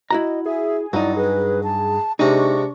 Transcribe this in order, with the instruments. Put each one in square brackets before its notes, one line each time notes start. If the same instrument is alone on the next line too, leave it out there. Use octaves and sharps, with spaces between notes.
[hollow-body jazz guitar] E4 F#4 A#5 [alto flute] D#5
[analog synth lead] G#4 [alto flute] E5
[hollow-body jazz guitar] G2 D#4 [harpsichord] F#3 [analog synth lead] E4 [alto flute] D5
[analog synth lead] G#4 [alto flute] B4
[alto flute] A5
[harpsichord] C3 G#3 C4 [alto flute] D4 [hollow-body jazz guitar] D#4 [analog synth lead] C#6